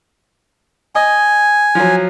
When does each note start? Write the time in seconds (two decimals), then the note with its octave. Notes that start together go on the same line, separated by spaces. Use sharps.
0.95 D#5 G#5
1.75 F3 F#3